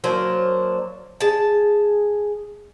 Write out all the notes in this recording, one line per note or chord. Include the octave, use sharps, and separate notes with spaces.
F#3 A#3 D4 C5
G#4 A5